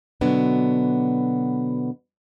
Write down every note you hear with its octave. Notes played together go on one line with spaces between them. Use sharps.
B2 D3 F#3 B3 D4